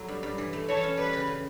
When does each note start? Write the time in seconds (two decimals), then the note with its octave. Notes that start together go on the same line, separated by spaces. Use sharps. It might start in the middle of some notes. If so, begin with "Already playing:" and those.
Already playing: F#3 A3 E4
0.08 G2
0.23 G2
0.38 E3
0.53 A3
0.68 E3 A4 C#5
0.83 C#4
0.97 G3 B4
1.13 C#3
1.27 C#3